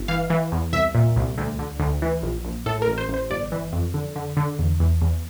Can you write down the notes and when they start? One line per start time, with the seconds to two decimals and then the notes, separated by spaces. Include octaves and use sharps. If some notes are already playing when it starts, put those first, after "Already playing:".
Already playing: G1
0.08 E3 F5
0.30 E3
0.52 E2
0.73 C2 E5
0.95 A#2
1.16 C2
1.38 D2
1.59 D3
1.80 D2
2.02 E3
2.23 A#1
2.45 A#1
2.66 A2 A4
2.82 A#4
2.87 A1
2.98 C5
3.09 A1
3.14 C5
3.30 G1 D5
3.52 E3
3.73 F2
3.94 D3
4.16 D3
4.37 D3
4.59 E2
4.80 E2
5.02 E2